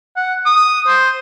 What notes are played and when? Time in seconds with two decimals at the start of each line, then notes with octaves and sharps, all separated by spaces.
0.16 F#5
0.46 D#6
0.88 C5